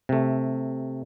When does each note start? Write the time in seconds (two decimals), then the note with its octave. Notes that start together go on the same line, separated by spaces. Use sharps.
0.09 C3 A3